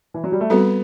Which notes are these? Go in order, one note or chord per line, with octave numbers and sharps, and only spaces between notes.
E3
F#3
G3
A3
G3 B3 C4 F#4 A4